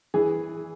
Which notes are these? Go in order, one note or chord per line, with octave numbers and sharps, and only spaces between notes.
E3 G#4